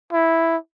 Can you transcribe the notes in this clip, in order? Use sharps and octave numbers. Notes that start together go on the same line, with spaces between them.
E4